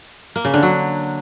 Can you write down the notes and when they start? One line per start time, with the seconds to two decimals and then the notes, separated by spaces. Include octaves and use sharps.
0.36 A#3
0.45 C#3
0.54 D3
0.63 F#3